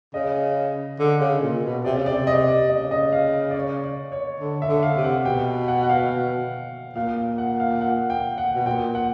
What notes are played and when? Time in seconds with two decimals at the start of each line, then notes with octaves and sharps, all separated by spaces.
0.14 C#3 D#5
0.99 D3
1.21 C#3
1.42 A#2
1.64 B2
1.84 C3 D5
1.97 C#3
2.06 C3 D5
2.27 D#5
2.48 D5
2.70 C#3 D#5
2.91 D#5
3.13 F5
3.51 D5
3.55 C#5
3.84 D5
4.12 C#5
4.40 D3
4.62 E5
4.68 D3
4.83 F5
4.96 C3
5.04 F#5
5.25 B2 G5
5.68 F#5
5.83 F#5
5.89 F5
6.95 A#2 F5
7.17 F5
7.38 F#5
7.60 F5
7.81 F#5
8.10 G5
8.38 F#5
8.54 B2
8.66 A#2 G5
8.95 F#5